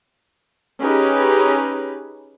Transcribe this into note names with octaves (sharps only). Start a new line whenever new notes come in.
C#4 D#4 G4 G#4 B4